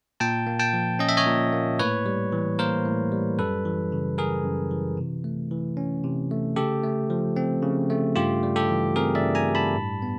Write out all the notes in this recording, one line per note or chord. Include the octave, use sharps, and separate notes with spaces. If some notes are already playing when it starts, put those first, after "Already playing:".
A#2 G5 A5
A#3
G5 A5
F3
C#4 D#5
E5
C#5 D#5
A#2
A#3
A2 B4 C#5
G3
E3
A#3 A#4 C5
A2
G3
F#2 A4 B4
E3
C#3
F#2 G#4 A#4
F#2
E3
C3
A3
E3
C#4
C3
A3
C#3 G4 A4
A3
F3
C4
C#3
A3
G2 F4 G4
G3
G4 A4
E3
C4 G#4 A#4
D5 E5
G2
G#5 A#5
G3
A5 B5
A2
B3